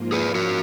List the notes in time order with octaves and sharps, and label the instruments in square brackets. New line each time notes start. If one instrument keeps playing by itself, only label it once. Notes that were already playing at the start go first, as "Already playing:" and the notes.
Already playing: [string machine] G#2 F3 A#3 F4
[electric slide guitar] G#4 B4
F#4 A#4